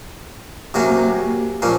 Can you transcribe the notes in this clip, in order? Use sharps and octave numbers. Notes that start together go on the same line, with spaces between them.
C3 F#3 A#3 C#4
A#2 F3 A#3 C#4